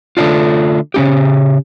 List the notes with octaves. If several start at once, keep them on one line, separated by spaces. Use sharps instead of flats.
D3 A3 D4 F4
C#3 F3 C#4 G4